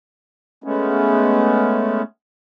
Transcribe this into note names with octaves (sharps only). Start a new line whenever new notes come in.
G#3 A3 B3 C#4